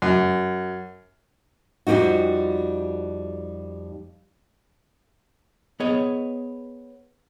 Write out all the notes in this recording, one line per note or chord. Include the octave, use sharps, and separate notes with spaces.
F#2
F2 G3 C4 D#4 F#4
B3 G#4 C#5 D#5